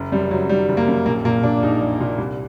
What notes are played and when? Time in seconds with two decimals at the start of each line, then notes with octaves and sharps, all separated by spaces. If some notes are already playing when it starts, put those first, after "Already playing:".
Already playing: F#1
0.12 F#2 G3
0.30 F#1 F#3
0.49 D#3 G3
0.69 F#1
0.77 A#3
0.88 F#2
1.06 A#1 A#3
1.25 A#2 A#3
1.43 A#2 D4
1.63 A#1 D#4
1.82 A#1
2.00 A#2
2.18 C2